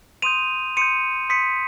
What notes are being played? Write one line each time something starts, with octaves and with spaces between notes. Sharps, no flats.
C6 D#6 G6 D#7 F7
C6 D#6 G6 C#7 D#7
C6 D#6 G6 B6 C#7